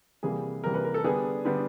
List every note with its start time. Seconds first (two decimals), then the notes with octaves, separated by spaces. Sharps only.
0.23 C3 E3 G3 A#3 G#4
0.64 C3 E3 G3 A#3 A#4
0.74 B4
0.85 A#4
0.94 A4
1.04 D3 G3 B3 D4 G#4
1.45 D3 G3 B3 D4